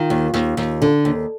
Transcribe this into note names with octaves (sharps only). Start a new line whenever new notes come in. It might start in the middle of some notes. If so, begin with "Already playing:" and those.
Already playing: D#3 F4
D#2
D#2
D#2
D3
D#2